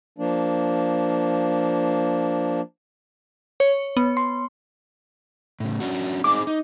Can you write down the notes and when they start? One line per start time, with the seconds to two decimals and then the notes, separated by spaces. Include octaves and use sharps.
0.18 F3 A#3 D4
3.60 C#5
3.97 B3
4.17 C6
5.60 A2 C#3
5.80 C#4 D4 F#4
6.24 C4 D#4 G#4 D6
6.47 D#4